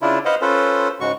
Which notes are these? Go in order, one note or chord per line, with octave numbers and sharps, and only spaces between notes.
C#3 D4 E4 F4
B4 C5 D#5 F5 F#5
C#4 F4 A4 B4 C5
G#2 C#3 G#3 F#4 C#6